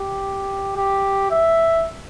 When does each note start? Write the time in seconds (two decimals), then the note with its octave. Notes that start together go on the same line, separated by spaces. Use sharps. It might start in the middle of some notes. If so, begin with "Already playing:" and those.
Already playing: G4
0.76 G4
1.31 E5